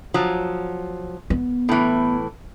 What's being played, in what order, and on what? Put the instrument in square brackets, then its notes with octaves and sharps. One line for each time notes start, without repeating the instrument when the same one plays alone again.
[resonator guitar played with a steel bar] F3 F#3
[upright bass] B3
[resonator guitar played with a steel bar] A2 E3